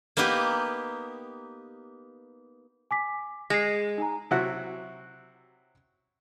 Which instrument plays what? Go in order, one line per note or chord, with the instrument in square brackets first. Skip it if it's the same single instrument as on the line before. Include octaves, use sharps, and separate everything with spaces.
[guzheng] A#3 B3 D#4 G4 B4
[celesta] G#5 D6 B6
[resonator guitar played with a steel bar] G#3 [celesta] A#6 C7
[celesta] D#4 G#5 A#5
[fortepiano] C3 F#3 E4 F#4 F#5